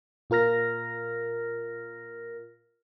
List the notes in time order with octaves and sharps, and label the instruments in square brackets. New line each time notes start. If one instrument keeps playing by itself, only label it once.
[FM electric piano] A#2 F4 A#4 F6 A#6